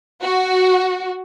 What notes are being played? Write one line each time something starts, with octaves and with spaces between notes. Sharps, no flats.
F#4